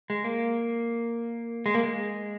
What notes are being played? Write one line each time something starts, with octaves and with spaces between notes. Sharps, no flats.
G#3
A#3
G#3
A#3
G#3